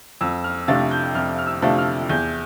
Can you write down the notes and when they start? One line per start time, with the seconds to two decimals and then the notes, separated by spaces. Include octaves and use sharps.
0.21 F2 E6
0.44 F6
0.68 C3 F3 A3 D4 A6
0.91 G6
1.15 F2 F6
1.38 F6
1.47 E6
1.62 C3 F3 A3 D4
1.78 F6
2.09 E2 G6